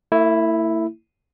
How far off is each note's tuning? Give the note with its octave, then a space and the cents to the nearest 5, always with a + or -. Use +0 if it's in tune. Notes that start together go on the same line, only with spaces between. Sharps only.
A3 +45 E4 +0